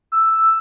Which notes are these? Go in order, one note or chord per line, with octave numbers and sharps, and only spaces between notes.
E6